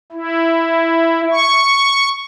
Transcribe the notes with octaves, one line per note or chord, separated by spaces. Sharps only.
E4
C#6